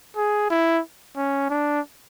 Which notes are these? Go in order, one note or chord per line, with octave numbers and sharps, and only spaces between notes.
G#4
E4
C#4
D4